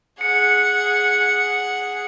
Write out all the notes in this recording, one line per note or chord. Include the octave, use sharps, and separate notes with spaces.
G#4 F#5 C#7